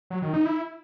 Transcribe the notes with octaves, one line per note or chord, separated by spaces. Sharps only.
F#3
D#3
D#4
E4